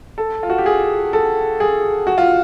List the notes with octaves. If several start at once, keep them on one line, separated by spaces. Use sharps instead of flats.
A4
F4
F#4
G4
G#4
A4
G#4
F#4
F4